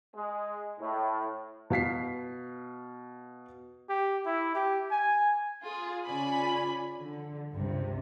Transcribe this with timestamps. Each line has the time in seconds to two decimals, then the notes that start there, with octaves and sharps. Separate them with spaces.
0.15 G#3
0.80 A2
1.70 B2 F5 B6 C7
3.90 G4
4.26 E4
4.55 G4
4.91 G#5
5.64 F4 G#4
6.05 C#3 C#4 F4 D5 G#5 B5
7.01 D3
7.55 C#2 G2 C3